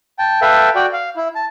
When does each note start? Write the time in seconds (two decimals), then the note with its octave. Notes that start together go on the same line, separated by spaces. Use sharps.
0.19 G5 A5
0.42 A4 B4 E5 F5 G5
0.75 F#4 D5 G5
0.93 F5
1.16 E4
1.35 A5